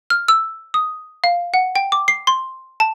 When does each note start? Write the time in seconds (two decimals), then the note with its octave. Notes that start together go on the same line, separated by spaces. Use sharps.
0.10 F6
0.28 E6
0.74 D#6
1.24 F5
1.54 F#5
1.76 G5
1.92 D6
2.08 C7
2.27 C6
2.80 A5